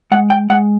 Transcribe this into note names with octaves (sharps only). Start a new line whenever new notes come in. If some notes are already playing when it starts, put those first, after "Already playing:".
G#3 F#5
G5
G#3 F#5